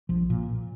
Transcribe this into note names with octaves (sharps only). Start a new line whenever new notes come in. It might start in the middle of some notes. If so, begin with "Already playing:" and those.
A#1 F3
A#2